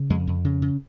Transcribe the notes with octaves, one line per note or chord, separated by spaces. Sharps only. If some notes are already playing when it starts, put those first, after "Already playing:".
Already playing: C#3
F2 G#3
F2
C#3
C#3